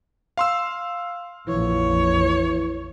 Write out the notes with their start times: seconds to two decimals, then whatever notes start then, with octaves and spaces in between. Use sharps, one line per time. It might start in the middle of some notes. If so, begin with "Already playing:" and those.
0.38 F5 C6 E6
1.48 A#1 F2 E3 F3 C#5